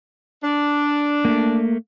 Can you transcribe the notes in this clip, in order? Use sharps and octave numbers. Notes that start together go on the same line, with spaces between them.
D4
A3 A#3